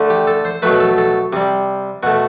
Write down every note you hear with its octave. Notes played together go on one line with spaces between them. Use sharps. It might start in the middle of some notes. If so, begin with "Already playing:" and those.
Already playing: D3 A3
G4
A4
C5
B2 F#3 A3 B4
A4
A4
C3 G3
B2 A3 F#4